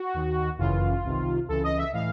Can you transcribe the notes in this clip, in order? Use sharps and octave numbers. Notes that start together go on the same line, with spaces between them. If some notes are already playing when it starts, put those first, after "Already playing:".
Already playing: F#4
D#2 D#3
G1 F#2 C#3 E3 F4
C2 C3 D#3
C#2 C#3 E3 A4
D#5
E5
A2 E3 F5